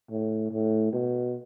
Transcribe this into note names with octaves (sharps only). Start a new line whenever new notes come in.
A2
A2
B2